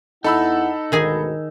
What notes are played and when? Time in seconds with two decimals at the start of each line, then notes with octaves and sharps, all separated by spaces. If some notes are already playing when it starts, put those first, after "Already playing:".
0.24 E2 D#4 E4 A4 F#5 B5 E6
0.92 D2 G#2 B2 D#3 G#4 G#5